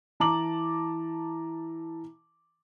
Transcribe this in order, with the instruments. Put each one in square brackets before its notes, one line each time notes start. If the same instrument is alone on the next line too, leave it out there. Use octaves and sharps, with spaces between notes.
[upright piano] E3 A5 A#5 D6 F#7